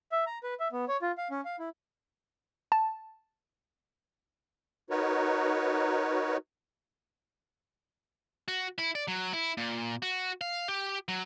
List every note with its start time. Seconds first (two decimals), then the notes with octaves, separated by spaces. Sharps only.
0.12 E5
0.27 A#5
0.43 B4
0.60 E5
0.72 B3
0.88 C#5
1.02 F4
1.18 F5
1.31 C#4
1.45 F5
1.59 E4
2.72 A5
4.90 D#4 F#4 A#4 B4 C#5
8.48 F#4
8.78 E4
8.95 D5
9.08 F#3
9.33 E4
9.57 A#2
10.02 F#4
10.41 F5
10.68 G4
11.08 F#3